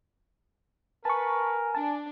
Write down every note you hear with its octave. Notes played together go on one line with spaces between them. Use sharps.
A#4 B4 G#5 A5 C#6
D4 A5